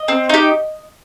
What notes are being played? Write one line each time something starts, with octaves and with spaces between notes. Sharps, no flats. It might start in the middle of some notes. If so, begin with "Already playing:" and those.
Already playing: D#5
C4
D#4 G4